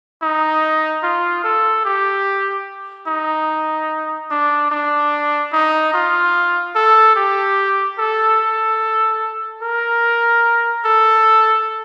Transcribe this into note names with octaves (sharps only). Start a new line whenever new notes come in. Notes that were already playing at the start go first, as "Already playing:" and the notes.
D#4
F4
A4
G4
D#4
D4
D4
D#4
F4
A4
G4
A4
A#4
A4